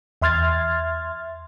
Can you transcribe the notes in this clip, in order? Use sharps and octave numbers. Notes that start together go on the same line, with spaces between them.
E2 E5 C6 F6 G#6 A6